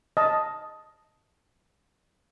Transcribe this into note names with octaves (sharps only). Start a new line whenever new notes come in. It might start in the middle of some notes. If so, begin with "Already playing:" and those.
D#5 A5